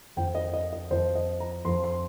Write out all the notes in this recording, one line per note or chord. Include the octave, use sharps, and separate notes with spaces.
F2 F3 G5
D#5
D#5
D#5
F2 F3 C5
D#5
A#5
F2 F3 C6
C6